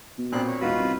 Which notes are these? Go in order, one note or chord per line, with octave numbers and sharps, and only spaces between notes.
B2
A#2 B3 C4 D4 F#6
C#5
E1 D#4 F4 F#4 B4
C2